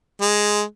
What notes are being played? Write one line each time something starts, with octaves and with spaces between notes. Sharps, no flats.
G#3